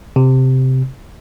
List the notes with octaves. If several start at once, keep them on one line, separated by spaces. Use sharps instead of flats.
C3